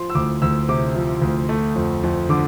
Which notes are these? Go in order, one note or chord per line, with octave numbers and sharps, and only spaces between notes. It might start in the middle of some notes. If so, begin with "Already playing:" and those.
Already playing: F3 C6
E6
D2 D6
D2 E6
C3 D6
F3
D2
A3
F2
F2
D3 D6